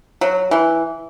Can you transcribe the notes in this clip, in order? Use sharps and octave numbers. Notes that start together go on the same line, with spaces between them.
F#3
E3